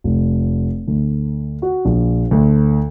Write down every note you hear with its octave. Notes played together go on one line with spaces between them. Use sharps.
F1
D2
F#4
A#1
D2